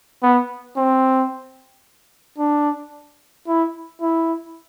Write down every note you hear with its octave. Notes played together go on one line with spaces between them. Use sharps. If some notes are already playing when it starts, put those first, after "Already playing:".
B3
C4
D4
E4
E4